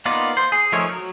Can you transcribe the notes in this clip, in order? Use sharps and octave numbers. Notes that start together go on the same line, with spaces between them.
A#3 B3 D#4 F4 D5
C5
G#4
F3 A3 D#4 A#4 C#5
F#3